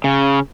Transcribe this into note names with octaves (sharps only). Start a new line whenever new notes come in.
C#3